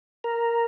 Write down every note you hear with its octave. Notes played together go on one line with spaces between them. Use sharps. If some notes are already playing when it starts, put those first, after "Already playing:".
A#4